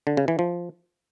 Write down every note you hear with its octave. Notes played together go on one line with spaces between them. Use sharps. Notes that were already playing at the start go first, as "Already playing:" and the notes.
D3
C#3
E3
F3